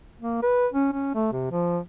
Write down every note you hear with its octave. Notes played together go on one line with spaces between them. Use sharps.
A#3
B4
C#4
C#4
A3
C3
F3